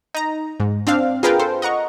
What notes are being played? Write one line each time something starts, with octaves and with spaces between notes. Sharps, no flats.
D#4 A#5
G#2
C4 D4 F5
F4 G#4 A#4 B4 F5 G5
A4 C5
D#5 F#5 A#5 C#6